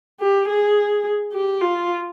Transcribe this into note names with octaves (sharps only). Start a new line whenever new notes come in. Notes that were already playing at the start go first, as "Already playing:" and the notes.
G4
G#4
G4
F4